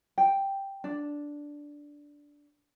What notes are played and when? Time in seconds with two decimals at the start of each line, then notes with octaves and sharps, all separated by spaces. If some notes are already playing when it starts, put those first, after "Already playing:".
0.18 G5
0.84 D4